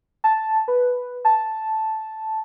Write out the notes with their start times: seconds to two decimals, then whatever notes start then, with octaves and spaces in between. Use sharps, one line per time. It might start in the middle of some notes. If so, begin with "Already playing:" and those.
0.24 A5
0.68 B4
1.25 A5